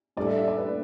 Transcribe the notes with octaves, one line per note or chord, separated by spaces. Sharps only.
A2 G3 D4 A4 D5
E5
E5
D5
B4
B4